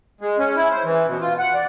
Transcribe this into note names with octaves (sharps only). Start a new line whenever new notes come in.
G#3
C#4
E4
C5
E3
B2
F4
F#5
D5